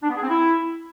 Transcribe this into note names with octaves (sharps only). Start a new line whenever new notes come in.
D4
B3
G#4
C4
E4